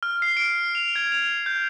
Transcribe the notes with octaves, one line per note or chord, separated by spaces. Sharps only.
F6
C7
D7
F7
G#6
F7
G6